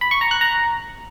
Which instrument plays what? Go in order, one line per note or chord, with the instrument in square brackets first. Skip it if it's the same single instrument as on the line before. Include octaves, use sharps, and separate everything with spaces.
[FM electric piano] B5
C#6
A#5
F#6
A#5